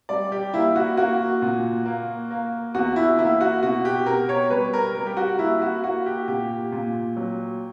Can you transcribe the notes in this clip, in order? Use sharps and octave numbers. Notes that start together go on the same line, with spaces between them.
G3 D5
G4
A#3 E4
F#4
A#3 F#4
A#2
A#3
A#3
E2 F#4
E4
A#3 E4
F#4
B2 F#4
G4
B2 A#4
C#5
G3 B4
A#4
G3 A#4
G4
F#4
A#3 E4
F#4
A#3 F#4
G4
A#2 G4
A#2
F#3